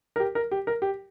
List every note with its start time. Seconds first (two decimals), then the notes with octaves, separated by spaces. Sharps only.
0.16 A#4
0.20 G4
0.35 A#4
0.51 G4
0.67 A#4
0.82 G4